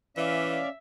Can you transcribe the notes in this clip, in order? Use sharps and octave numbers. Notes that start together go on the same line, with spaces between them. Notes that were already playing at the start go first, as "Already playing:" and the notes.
E3 C#4 D5 E5 F5